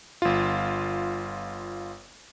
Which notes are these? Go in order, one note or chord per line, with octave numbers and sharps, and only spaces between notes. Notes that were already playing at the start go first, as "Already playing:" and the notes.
G1 F4